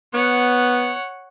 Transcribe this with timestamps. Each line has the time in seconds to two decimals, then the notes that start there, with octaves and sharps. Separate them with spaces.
0.14 B3 C#5 F#5